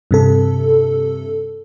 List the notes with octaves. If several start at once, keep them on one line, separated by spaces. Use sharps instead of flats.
G2 C3 A4